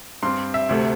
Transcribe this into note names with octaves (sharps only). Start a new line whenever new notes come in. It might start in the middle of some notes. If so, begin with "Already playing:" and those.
G2 G3 C4 C6
E5
D2 C3 A3